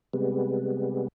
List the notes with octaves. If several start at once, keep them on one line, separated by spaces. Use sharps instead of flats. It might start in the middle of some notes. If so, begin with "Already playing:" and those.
C3 G3 G#3 B3